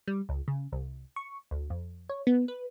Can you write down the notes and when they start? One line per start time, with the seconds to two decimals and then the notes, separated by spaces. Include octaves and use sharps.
0.07 G3
0.29 C#2
0.48 C#3
0.72 C2
1.16 C#6
1.51 D2
1.70 F2
2.09 C#5
2.27 B3
2.48 B4